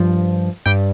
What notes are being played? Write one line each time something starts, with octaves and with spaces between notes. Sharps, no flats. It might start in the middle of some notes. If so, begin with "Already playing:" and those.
Already playing: G2 F3
G2 G3 G5